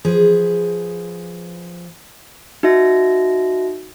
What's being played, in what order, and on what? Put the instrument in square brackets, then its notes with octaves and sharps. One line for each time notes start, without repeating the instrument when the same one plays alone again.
[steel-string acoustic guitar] F3 G#4 B4
[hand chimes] D#4 F#4 E5 A#6